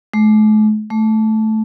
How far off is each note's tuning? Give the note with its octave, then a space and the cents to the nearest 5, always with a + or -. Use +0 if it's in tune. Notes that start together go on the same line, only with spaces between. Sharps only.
A3 -45
A3 -10